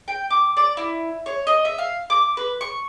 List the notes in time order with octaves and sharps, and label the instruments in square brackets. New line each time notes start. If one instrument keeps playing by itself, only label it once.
[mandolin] G5
D6
D5
E4
C#5
D#5
E5
F5
D6
B4
C#6